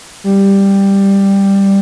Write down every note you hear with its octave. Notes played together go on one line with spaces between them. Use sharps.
G3